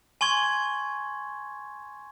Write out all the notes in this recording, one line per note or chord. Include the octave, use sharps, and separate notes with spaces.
G#5 C6 C#6 G#6